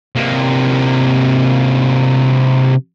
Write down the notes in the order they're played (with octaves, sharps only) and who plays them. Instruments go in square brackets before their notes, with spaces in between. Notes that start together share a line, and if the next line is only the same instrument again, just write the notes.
[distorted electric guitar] C3 A#3